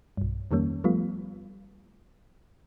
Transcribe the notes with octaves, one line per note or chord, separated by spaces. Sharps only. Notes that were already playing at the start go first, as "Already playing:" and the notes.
B1 G2
F2 D#3 G3 A#3 C#4
F3 G3 A3 B3 F4